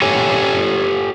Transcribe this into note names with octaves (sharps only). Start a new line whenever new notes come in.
G4 A4 C#5 G#5